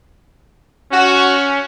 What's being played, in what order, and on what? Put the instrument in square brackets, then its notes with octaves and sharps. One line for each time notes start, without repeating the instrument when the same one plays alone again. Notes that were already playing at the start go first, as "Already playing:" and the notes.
[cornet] C#4 [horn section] F#4